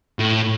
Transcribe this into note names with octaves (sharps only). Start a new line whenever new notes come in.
A2